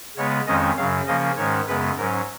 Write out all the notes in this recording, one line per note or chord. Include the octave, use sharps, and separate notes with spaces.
C#3 G#3 B3 C#5
F2 D#3 G#3 C#4 D#5
F#2 C#3 F#3 F5
C#3 F3 A#3 C#4 D#5
G#2 D#3 G#3 C#4 C#5
F#2 C#3 G#3 B3 B4
G#2 F#3 C#4 A#4